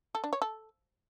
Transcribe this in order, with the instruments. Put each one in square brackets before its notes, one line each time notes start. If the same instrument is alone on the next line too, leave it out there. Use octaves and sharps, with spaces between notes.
[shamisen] A4
D4
C#5
A4